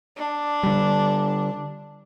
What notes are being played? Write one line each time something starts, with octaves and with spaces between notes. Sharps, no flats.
D4
D3 G3